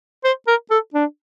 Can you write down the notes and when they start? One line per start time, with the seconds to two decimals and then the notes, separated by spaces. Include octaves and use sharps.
0.24 C5
0.48 A#4
0.71 A4
0.94 D4